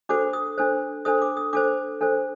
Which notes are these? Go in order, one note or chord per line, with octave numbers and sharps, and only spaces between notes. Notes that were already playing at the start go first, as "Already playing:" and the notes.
D4 F#4 A4 C5 D6
D#6
D4 A4 C5
D4 A4 C5 D#6
D6
D#6
D4 A4 C5 D6
D4 A4 C5